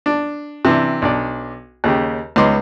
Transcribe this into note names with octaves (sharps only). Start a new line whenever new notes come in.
D4
C3 E3 D4
B1 D4 D5
D#2 C#3 G4
C#2 B3 D#4 C6 D6